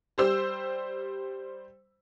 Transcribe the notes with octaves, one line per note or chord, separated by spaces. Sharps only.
G3 C5 E6